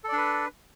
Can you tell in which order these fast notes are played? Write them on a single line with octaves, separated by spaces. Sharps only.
A4 D5 D4 B4